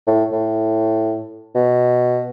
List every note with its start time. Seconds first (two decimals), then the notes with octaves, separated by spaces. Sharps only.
0.07 A2
0.32 A2
1.55 B2